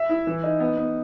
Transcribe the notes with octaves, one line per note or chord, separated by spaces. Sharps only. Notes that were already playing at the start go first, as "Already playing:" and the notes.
Already playing: E5
E4
E3
D#4
B3
B3